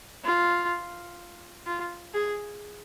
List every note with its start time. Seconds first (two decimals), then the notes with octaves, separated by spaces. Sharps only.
0.25 F4
1.67 F4
2.14 G#4